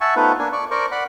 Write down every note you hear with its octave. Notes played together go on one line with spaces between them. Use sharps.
E5 F#5 G#5 A5 C#6
A3 B3 D#4 F4 B4 C5
A#3 D4 G#5
D5 C#6
A#4 C5 D5 C#6
D5 F#5 B5